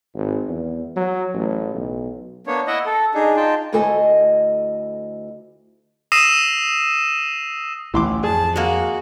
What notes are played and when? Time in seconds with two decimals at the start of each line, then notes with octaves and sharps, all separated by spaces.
0.15 G#1
0.48 E2
0.97 F#3
1.34 A1
1.74 B1
2.47 A#3 B3 D4 C#5
2.67 E4 D#5 E5 F#5
2.86 A4
3.14 D4 D#4 G#4
3.37 D#4 F4 G5 A5
3.73 D2 E4 F#4 A4 D#5 G#5
6.12 D#6 E6 A#6 C7 D#7 E7
7.94 A1 D2 A2 E3 C6 D6
8.24 F2 G#4 A5
8.56 G#3 A#3 F#4